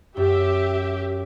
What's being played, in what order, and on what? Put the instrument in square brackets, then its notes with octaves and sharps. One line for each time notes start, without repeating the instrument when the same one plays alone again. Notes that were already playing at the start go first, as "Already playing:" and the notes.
[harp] F#2 [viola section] G4 E5